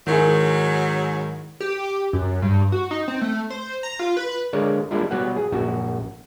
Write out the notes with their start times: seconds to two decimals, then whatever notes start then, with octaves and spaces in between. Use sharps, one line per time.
0.07 G#2 D#3 F#3 E4 G#4
1.60 G4
2.13 F#2
2.42 G2
2.72 F#4
2.91 D#4
3.08 C4
3.21 A3
3.50 C5
3.83 A#5
3.99 F4
4.17 B4
4.53 D3 G#3 A#4 C#5 D5 F5
4.91 G3 G#3 A#3 D4 E4 F4
5.11 B2 F#3 G3 B3 F#5
5.36 G#4
5.52 A#1 F#2 F#4